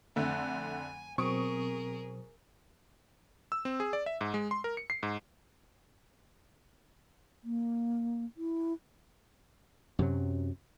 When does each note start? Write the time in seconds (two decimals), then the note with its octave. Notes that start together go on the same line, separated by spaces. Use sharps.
0.16 F2 D3 A3 G#5
1.18 B2 F#3 C4 G#4 A#4 C#6 D#6 D7
3.52 E6
3.65 C4
3.80 G#4
3.93 D5
4.06 E5
4.21 G#2
4.34 G#3
4.51 C6
4.64 A#4
4.77 C#7
4.90 C7
5.03 G#2
7.44 A#3
8.37 E4
9.99 F#2 C3 F#3